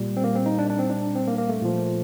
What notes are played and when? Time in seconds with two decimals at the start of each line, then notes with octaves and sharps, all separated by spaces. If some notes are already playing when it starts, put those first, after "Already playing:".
Already playing: A#2 G3
0.17 C4
0.24 A#3
0.35 C4
0.46 D#4
0.59 D4
0.70 D4
0.79 C4
0.90 D4
1.15 C4
1.27 A#3
1.38 A#3
1.49 A3
1.62 A#2 F3